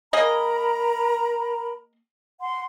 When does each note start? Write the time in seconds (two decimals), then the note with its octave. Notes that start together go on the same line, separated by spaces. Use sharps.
0.13 A#3 G#4 A#4 D#5 A#5 B5
2.41 F#5 C6